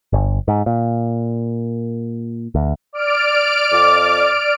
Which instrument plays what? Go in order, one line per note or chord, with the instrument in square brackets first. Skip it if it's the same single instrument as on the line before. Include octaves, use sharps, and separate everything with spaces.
[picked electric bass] G1
G#2
A#2
D2
[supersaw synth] D5 F6 D7
[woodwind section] F2 D6